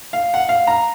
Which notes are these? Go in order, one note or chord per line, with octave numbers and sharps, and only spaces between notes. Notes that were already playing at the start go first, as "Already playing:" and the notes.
F5
F#5
F5
A#5